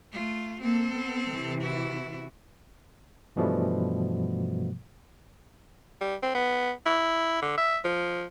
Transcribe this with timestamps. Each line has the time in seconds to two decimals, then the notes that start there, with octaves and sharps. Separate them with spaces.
0.12 A3 F4
0.61 A#3 C4 A4
0.92 B3
1.30 C3 E3
1.62 E4 F#4
3.36 G2 B2 E3 F3 G3 A3
6.01 G3
6.23 C4
6.35 B3
6.86 E4
7.42 D3
7.58 E5
7.85 F3